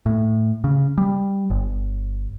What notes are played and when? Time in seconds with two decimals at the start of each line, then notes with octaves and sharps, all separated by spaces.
0.06 A2
0.64 C#3
0.98 G3
1.50 G1